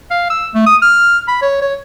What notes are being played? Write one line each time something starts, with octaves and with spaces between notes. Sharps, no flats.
F5
E6
A3
D#6
F6
B5
C#5
C#5